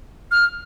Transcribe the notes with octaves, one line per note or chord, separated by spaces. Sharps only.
F6